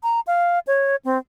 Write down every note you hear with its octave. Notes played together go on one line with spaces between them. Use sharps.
A#5
F5
C#5
C4